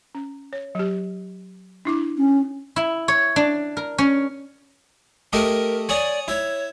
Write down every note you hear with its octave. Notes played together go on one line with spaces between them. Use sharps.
C#4
C#5
F#3 G4
D4 E4 D6
C#4
E4
C#5
D4
A#4
C#4
A3 G4 A#4 D#5
C#5 D5 G#5 D#6
E4 C#5